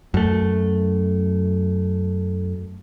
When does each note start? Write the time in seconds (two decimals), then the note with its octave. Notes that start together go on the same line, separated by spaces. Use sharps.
0.14 F#2 A3